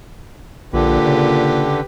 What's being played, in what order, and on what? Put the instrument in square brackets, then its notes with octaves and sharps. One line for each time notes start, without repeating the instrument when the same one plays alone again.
[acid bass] A#1 [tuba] A#2 [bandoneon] D3 [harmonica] G4 B4
[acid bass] C#3